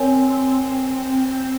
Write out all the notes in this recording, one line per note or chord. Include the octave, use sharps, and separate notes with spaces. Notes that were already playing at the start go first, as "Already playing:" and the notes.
Already playing: C4 A#4 C#5 G#5